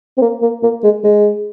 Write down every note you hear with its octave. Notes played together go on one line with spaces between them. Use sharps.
C4
A#3
A#3
A#3
G#3
G#3